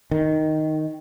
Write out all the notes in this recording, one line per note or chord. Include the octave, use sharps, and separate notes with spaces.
D#3